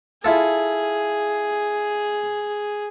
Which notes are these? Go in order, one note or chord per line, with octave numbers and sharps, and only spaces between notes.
E4 F4 G#4 A4